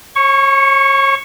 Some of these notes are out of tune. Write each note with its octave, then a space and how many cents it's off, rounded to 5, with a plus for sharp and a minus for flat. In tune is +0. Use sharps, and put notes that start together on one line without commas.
C#5 -35 C#6 +0